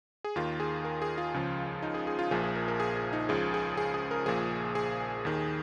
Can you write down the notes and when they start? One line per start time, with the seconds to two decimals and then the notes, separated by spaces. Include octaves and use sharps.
0.24 G#4
0.36 D#2 D#3 F4
0.60 G#4
0.85 A#4
1.02 G#4
1.18 F4
1.34 C#2 C#3 F3
1.82 D#4
1.94 G#4
2.07 G#4
2.19 F4
2.31 A#1 A#2 F3 G#4
2.44 G#4
2.55 A#4
2.68 A#4
2.80 G#4
2.97 G#4
3.13 D#4
3.29 C#2 C#3 F3 G#4
3.54 G#4
3.77 G#4
3.94 G#4
4.11 A#4
4.26 A#1 A#2 F3 G#4
4.75 G#4
5.25 D#2 D#3